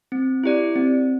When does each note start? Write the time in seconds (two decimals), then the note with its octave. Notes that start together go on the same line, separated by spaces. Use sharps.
0.12 C4
0.44 E4 G4 D5
0.76 C4